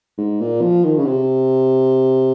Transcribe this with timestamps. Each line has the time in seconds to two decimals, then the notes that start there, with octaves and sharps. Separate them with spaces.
0.18 G#2
0.40 A#2
0.62 F3
0.84 D#3
0.98 C#3
1.06 C3